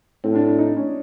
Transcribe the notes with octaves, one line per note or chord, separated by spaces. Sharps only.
A2 C4
D4
D4
D#4
C#4